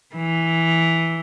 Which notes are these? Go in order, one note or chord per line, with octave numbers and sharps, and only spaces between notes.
E3